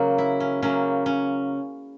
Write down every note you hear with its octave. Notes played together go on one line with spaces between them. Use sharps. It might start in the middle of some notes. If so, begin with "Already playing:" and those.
Already playing: C#3 F#3 A#3
E4
C#4
C#3 F#3 A#3 C#4
C#4